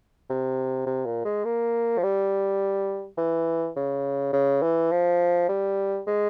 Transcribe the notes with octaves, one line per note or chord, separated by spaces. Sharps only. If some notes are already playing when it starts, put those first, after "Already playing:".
C3
C3
A#2
G#3
A#3
F3
G3
E3
C#3
C#3
E3
F3
G3
G#3